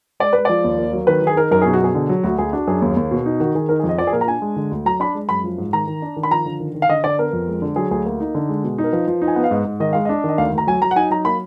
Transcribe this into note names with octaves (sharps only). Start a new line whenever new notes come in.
G#3 D5
G#3 B4
F3 D5
D#2
A#3
F#3
D#3 B4
D#3 G#4
D#4 A#4
F#2 A#4
B2 G#4
F#4
B2 G#4
D3
F#3
D2 F#4
D2 G#4
D4 F#4
F#2 G#4
D#2
D#2
B2
D#4
D#3 F#4
D#3 G#4
D#4 A#4
G#4
F2
D#5
F3 D5
G#4
A#2 A#4
A#5
D4 G#5
G#3
D3
D2
F#3 A#5
D4 B5
G#3
F#2 B5
F3
G#2
D#3 A#5
D#3
D4
D#3
B5
F3 A#5
D3
D#3
D#3
F5
D3 D#5
D3 D5
B3 A#4
F2
G#3
D3
F#3 G#4
D2 G#4
A#3
D#4
D3
G#3
B2
D#4
A#4
F3 B4
F3
D#4
G#5
B3 F#5
F5
G#2 D#5
G#2
D#3 D#5
G#3 F5
D4 D#5
D#3 D#5
D2 F5
D2
A#5
F#3 G#5
F#3 A#5
F#5
D#4 G#5
F#3 A#5
A#3 B5